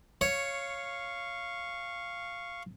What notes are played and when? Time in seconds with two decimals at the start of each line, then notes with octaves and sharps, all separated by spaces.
0.21 C#5 F5 C#6